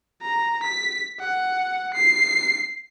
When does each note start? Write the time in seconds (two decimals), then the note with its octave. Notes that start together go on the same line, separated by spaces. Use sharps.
0.21 A#5
0.63 B6
1.20 F#5
1.94 C7